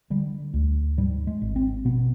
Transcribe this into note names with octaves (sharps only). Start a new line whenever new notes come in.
D3 G3
D2
G#2 G3
G#3
G#1
C4
B2 B3